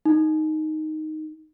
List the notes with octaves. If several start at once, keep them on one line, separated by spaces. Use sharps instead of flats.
D#4